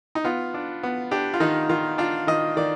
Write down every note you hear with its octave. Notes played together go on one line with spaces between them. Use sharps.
D#4
B3 F4
D4
B3
D4 G4
F4
D#3 D#4
D#3 F4
D4 F4
D#3 D#5
D#3 D5